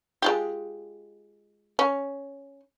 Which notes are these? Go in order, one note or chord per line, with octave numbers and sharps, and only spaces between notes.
G#3 F4 G4
C#4